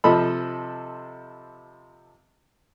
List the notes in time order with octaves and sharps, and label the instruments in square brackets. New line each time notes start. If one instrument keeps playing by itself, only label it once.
[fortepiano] C3 F3 A4 D#5 B5